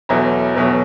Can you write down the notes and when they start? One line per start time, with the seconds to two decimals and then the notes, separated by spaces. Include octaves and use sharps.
0.09 E2 B2 F#3 A3 A#5
0.55 E2 B2 F#3 A3